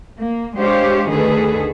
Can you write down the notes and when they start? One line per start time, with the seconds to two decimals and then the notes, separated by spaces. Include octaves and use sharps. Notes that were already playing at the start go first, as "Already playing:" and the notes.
0.18 A#3
0.56 G#3 D4 G4 C5 C#5 F5
1.09 D2 D3 D#3 G#4 A4 B4